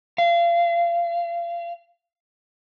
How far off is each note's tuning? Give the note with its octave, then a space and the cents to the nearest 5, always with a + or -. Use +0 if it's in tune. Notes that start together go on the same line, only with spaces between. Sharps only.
F5 -30